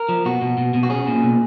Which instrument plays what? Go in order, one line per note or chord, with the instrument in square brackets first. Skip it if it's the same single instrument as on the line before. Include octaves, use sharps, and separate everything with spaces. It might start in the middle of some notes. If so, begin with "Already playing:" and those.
Already playing: [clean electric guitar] A#4
F3
B2 F#4
B2
B2
B2
F#4
C#4 G#4
A#2
B2